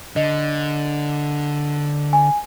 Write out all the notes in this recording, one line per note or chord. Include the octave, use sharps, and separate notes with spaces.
D3 D#5
G#5